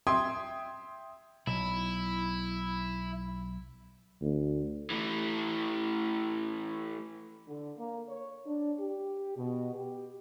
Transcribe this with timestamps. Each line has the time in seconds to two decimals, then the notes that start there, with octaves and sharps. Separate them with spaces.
0.07 E5 G5 C6 D#6 G#6
1.47 B1 E4
4.22 D2
4.90 E3 A3
7.47 D3
7.77 A#3
8.09 C#5
8.46 D4
8.79 G4
9.38 B2
9.74 G4